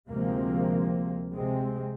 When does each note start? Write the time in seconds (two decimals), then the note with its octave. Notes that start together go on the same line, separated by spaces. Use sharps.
0.10 D2 C3 F3 G#3 A#3 C4
1.33 C3 G#3 C4